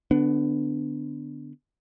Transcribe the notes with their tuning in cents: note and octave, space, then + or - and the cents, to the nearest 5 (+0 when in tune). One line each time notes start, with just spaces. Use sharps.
D3 +0 B3 +20 D4 +0